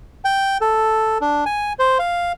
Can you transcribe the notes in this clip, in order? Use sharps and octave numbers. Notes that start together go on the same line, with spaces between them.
G5
A4
D4
G#5
C5
F5